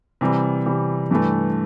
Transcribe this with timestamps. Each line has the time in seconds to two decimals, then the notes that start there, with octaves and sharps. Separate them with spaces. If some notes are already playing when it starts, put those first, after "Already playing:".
0.21 C3 E3 G3
0.66 C3 E3 G3
1.11 G2 E3 A3